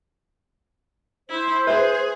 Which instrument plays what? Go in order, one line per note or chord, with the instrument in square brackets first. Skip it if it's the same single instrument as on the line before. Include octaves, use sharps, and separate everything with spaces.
[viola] E4 [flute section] C5
[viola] G#4 [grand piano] B4 [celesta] E5